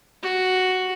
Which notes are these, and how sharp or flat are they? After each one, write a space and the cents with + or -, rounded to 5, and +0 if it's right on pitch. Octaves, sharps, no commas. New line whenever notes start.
F#4 +5